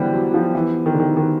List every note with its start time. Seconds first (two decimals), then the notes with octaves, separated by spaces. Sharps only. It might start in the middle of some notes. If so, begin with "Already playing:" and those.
Already playing: D3 E3 F#3 G3 B3 E4 G4 C5
0.13 F#3
0.34 F3
0.55 E3
0.86 D#3
0.94 D3
1.00 D#3
1.17 D#3